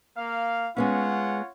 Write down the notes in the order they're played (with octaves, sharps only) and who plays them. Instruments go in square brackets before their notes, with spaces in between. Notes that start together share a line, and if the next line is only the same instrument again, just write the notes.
[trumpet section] A#3 F5
[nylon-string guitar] G#3 B3 C#4 [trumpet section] F4 C#5 F#5